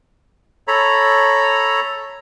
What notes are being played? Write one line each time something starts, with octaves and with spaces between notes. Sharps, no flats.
A4 C#5 A#5 B5